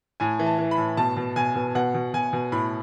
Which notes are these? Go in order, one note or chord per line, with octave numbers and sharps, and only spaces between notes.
A2 G#5
E3
A5
E3
B5
A2
B2 A5
B2
B2 G#5
B2
B2 F#5
B2
B2 G#5
B2
A2 B5